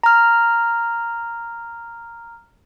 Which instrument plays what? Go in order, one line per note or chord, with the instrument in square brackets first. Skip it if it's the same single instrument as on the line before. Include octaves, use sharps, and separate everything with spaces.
[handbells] A#5 F6